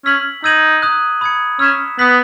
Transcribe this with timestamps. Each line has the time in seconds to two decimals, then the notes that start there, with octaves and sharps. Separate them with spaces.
0.06 C#4 E6 B6 F#7
0.44 D#4 E6 G#6 D#7 F#7
0.82 A#5 D#6 F#6
1.21 B5 D#6 G#6 C#7
1.59 C#4 E6 B6 E7
1.99 B3 D#6 F#6 B6 F#7